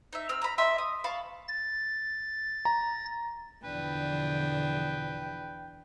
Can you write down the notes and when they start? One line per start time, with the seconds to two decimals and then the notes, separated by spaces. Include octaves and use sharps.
0.13 D#4 E5
0.29 C4 E6 F6
0.42 A#5 B5
0.58 G4 D#5 E5 C6
0.78 D#6
1.04 F5 A5 B5 C#6
1.48 A6
2.65 A#5
3.64 E2 B2 D3 F3 D4 B4 G5